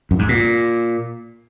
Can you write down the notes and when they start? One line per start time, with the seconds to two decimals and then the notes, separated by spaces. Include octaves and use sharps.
0.11 F#2
0.19 G#2
0.29 A#2